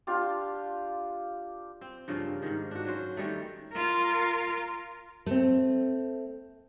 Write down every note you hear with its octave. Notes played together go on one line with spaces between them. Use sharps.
D4 F4 G4
C4
G2 C#3 F3 A#3
G#2 D#3
D4 F#4
F#3 C#4 C5
D#3 G3 A3
F4 A#4
A3 C4